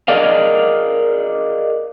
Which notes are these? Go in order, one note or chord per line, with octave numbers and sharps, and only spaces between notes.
G#4 A#4 D5 D#5 F5